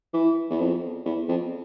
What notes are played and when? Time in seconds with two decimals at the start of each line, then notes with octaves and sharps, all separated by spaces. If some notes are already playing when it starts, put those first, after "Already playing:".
0.14 E3
0.50 E2
0.59 F2
1.06 E2
1.29 F2